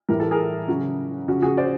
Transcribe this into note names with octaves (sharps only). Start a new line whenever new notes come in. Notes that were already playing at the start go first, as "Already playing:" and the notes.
A2 E3 G3 A#4
A4
G#4 A#4
C#3 F#3 F#4
C#3 F3 F#4
F#4 G#4
C5 D5